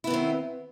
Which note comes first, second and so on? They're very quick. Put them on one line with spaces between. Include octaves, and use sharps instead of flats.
E4 B3 D#3 C4